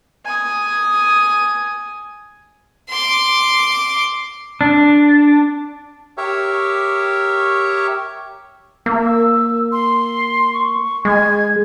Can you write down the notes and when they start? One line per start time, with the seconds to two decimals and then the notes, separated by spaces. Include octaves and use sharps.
0.25 G#5 D#6
2.89 C6 D6
4.61 D4
6.17 G4 A#4 C#5 E5
8.86 A#3 E6
9.72 C6
10.54 C#6
11.05 G#3 G#6